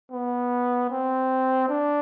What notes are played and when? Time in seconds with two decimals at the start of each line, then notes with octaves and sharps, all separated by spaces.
0.12 B3
0.90 C4
1.69 D4